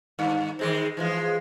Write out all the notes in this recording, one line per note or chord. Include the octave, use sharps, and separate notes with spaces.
G2 D#3
D#3 G#3 C4
E3 F3 G#3